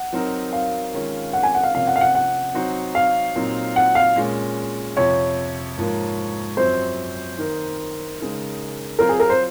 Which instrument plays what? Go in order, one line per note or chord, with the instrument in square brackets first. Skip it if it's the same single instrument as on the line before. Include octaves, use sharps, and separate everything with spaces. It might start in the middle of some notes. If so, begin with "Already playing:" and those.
Already playing: [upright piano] F#5
[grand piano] F#3 C4 D#4 A#4
[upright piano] F5
[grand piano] D#3 G#3 C#4 F4
[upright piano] F#5
G#5
F#5
F5
[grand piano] C3 F3 A#3 C#4 [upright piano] F5
[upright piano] F#5
F5
F#5
F#5
[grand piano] F#3 C4 D#4 F#4 C5
[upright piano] F5
[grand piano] A#2 F#3 C4 D#4
[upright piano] F#5
F5
[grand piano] A#2 G#3 C#4
[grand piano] F2 C3 F3 [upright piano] C#5
[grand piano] G#2 F3 A#3
[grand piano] F#2 F3 C4 F#4 [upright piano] C5
[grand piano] D#3 A#3 D#4 A#4
C#3 G#3 D#4 A#4
[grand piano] F#3 C4 F4 C5 [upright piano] A#4
[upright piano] G#4
A#4
C5